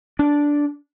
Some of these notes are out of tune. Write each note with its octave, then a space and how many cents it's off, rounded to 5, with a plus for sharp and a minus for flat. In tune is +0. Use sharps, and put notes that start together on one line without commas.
D4 -10